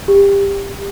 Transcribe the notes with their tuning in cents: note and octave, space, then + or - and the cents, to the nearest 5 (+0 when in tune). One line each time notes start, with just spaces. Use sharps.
G4 +20